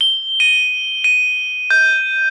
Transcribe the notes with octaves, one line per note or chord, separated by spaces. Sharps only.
G7
D#7
D#7
G6